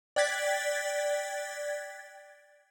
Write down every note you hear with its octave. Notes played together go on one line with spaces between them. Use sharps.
D5 G5 F#6 G#6 A6 B6